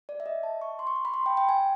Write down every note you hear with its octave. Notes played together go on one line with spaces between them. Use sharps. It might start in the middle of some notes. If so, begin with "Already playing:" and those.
D5
E5
D#5
A5
C#6
C6
C#6
C6
B5
C6
G5
G5
G#5